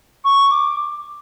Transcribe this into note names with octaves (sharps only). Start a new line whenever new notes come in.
C#6
D6